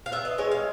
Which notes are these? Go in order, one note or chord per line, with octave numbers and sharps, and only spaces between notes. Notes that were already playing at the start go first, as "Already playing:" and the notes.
F5
B3 E5
D#5
G#3 C#5
F5